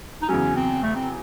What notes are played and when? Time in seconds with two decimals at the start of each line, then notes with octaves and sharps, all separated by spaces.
0.22 D#4
0.29 E2 C#3 F#3 C#4
0.56 C4
0.83 A3
0.95 C4